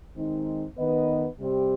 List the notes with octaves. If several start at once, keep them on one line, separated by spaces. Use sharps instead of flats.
D#3 G#3 C4 D#4
D#3 B3 D#4 B4 D#5
C3 G3 C4 G4